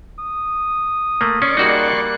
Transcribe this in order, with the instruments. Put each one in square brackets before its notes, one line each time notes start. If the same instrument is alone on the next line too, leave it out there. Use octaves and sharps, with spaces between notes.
[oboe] D#6
[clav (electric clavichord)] A3 A#3
[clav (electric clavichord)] C#4 [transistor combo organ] D5 C6 C#6
[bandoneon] G3 A#3 F#6 [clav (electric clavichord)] D#4 F#4 G#4